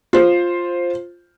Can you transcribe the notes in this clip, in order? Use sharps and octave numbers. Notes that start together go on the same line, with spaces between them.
F4 C5